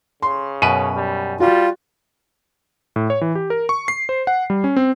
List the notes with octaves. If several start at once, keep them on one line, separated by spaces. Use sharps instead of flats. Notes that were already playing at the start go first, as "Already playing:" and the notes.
C#3 C6
F#2 B2 B4 D#7
G3
G3 F4 F#4
A2
C#5
E3
G4
A#4
C#6
C7
C5
F#5
G3
C#4
C4